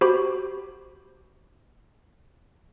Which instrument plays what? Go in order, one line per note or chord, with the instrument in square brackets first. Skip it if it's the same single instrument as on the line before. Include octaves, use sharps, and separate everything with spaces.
[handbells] F#4 G4 C5 B5